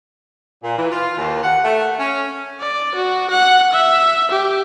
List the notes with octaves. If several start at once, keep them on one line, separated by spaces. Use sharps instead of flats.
A#2
E3
F4
D#2
F#5
A3
C#4
D5
F#4
F#5
E5
G4